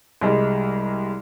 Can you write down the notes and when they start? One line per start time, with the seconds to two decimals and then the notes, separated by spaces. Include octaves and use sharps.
0.21 C2 G3 G#3